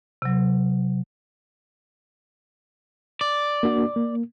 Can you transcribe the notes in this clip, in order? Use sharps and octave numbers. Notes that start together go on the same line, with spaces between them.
C3 F#3
D5
A#3 D4 F#4
A#3